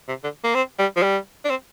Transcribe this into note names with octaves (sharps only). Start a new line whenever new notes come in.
C3
D3
A#3
C4
G3
F3
G3
D4
C4